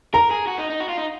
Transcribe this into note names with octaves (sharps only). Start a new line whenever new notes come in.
A#4 A#5
G#4
F#4
D#4
D#4
F#4
F4
D#4